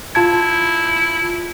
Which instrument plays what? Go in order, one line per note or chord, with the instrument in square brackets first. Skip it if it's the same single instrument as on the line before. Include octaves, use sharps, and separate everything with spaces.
[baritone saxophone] E4 [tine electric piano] F4 A5 G#6